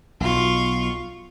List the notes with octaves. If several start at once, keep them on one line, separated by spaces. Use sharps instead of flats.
B1 B2 F4 C#6